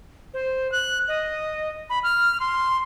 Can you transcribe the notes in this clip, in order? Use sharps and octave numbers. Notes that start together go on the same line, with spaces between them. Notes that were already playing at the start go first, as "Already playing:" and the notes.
C5
F#6
D#5
B5
F6
C6